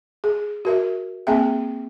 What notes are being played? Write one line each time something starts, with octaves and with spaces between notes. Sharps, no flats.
G#4
F#4 A#4 E5
A#3 C4 G#4 E5 G5